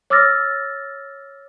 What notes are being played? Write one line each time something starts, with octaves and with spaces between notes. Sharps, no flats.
C#5 D6 E6 F6 A6 A#6